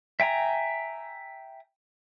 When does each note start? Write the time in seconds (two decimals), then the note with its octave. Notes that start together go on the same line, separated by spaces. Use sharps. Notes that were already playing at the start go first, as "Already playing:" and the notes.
0.20 E5 G5 G#5 A#5